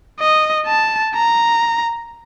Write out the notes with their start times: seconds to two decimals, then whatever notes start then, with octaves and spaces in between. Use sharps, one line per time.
0.20 D#5
0.67 A5
1.15 A#5